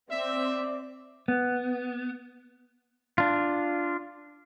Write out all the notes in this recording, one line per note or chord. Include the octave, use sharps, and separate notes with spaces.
C4 D5 E5
B3
D4 F4